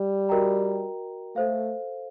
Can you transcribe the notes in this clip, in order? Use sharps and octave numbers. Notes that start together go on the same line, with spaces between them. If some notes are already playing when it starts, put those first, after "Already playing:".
Already playing: G3
F#4 A#4 D#5 G5 A#5
A3 A4 C5 F5